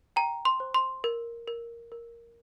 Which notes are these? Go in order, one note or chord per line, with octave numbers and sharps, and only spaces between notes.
G5 A#5
C6
C5
C6
A#4
A#4
A#4